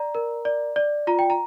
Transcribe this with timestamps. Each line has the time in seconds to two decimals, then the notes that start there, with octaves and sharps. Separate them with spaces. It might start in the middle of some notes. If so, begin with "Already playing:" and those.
Already playing: D5 A#5
0.15 A#4
0.45 D5
0.76 D5
1.07 F4 A#5
1.19 G5
1.30 A#5